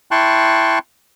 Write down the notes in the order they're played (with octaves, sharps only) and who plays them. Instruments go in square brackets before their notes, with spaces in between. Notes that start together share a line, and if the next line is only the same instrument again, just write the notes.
[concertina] E4 G5 A5 C6 C#6 F#6